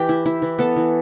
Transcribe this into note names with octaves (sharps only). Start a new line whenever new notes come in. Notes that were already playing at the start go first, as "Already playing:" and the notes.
Already playing: E3 G4 G5
E4
E4
E3
B3 A4 A5
E3